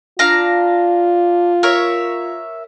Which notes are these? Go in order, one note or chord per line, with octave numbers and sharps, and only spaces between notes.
D4 F4 F5 A#5
A#4 C#5 E5